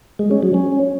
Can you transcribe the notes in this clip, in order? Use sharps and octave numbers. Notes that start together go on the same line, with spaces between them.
G#3
C#4
F#3
C#4